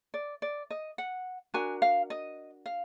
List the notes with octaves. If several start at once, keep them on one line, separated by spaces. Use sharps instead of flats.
D5
D5
D#5
F#5
D4 F#4 A#4 G#5
F5
D#5
F5